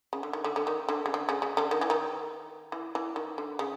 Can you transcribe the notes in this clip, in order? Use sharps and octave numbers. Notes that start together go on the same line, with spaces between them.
C#3
D3
D#3
D3
D3
D#3
D3
C#3
D3
C#3
C#3
D3
D#3
E3
D#3
E3
E3
D#3
D3
C#3